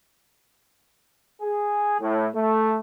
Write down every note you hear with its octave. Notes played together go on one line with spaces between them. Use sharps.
G#4
A2
A3